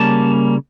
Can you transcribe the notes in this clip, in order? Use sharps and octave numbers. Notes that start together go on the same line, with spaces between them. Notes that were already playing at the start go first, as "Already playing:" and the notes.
Already playing: C#3 G3 A#3 C#4 A5